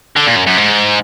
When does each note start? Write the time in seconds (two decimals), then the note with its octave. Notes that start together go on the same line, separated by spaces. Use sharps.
0.16 D3
0.27 A#2
0.36 F#2
0.46 F#2
0.57 G#2